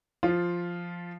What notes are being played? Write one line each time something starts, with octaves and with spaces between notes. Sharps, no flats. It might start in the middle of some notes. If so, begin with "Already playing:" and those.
F3 F4